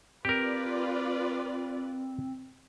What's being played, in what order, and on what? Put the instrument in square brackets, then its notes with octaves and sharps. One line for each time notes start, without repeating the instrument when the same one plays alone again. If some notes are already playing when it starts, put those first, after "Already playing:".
[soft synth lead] C4 [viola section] F4 B4 D5 [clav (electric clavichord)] G4 A#4